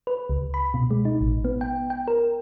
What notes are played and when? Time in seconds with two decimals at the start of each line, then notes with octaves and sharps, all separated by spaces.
0.07 B4
0.30 C#2
0.54 B5
0.74 B2
0.91 G#3
1.05 D#4
1.21 A1
1.45 B3
1.61 G5
1.90 G5
2.08 A#4